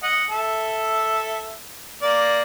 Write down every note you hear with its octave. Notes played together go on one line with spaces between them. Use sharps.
D#5 F#5
A4 E5
A#3 D5